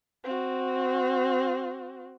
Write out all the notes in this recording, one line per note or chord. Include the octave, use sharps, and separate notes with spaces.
C4 F#4